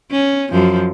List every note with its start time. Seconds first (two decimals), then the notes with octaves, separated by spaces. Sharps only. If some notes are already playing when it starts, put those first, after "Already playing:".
0.11 C#4
0.52 F#2 F3